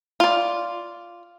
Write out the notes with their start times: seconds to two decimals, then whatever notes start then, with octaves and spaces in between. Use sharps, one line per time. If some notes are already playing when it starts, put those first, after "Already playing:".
0.20 F4 D5